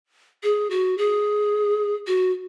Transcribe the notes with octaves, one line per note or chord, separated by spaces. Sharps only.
G#4
F#4
G#4
F#4